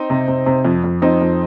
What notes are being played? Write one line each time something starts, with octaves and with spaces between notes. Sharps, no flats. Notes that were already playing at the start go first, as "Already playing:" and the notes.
Already playing: C4 D#4
C3
C3
C3
F2
F2
F2 C4 D#4
F2